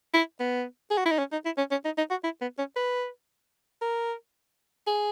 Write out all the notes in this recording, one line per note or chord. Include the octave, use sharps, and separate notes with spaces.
E4
B3
G#4
F#4
E4
D#4
C#4
D#4
E4
C#4
C#4
D#4
D#4
F#4
E4
B3
C#4
B4
A#4
G#4